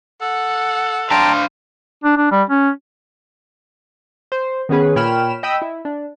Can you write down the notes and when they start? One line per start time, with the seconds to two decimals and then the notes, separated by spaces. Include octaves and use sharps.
0.21 A4 F#5
1.11 D4 C5 F5 G5 A5 A#5
2.04 D4
2.17 D4
2.31 G3
2.50 C#4
4.32 C5
4.69 D#3 B3 C#4 G#4 B4
4.96 A#2 C#5 G5 B5 F6 E7
5.43 D#5 G5 B5 D#6 E6
5.62 E4
5.85 D4